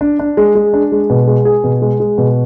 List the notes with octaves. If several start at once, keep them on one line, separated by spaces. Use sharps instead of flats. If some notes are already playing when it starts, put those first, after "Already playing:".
D4
D4
G#3
G#3
D4
G#3
B2
G#3
G#4
B2
G#3
G#3
B2